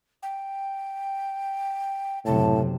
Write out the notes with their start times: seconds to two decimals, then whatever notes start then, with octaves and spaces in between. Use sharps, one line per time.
0.23 G5
2.26 F#1 A2 C3 A5